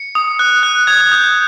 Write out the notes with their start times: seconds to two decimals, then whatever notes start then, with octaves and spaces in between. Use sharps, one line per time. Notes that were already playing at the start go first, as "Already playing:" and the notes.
Already playing: C#7
0.15 D#6
0.39 F#6
0.63 F#6
0.87 D#6 G#6
1.00 G#6
1.12 D#6 G6
1.24 G#6